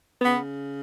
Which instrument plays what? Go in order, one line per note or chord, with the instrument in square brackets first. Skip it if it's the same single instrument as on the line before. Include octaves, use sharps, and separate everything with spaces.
[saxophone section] C#3 B3